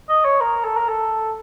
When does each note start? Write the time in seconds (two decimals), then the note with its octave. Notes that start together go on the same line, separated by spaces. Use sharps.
0.09 D#5
0.25 C#5
0.41 A#4
0.65 A4
0.77 A#4
0.89 A4